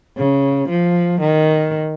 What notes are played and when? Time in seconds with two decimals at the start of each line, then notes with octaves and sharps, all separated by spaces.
0.17 C#3
0.69 F3
1.21 D#3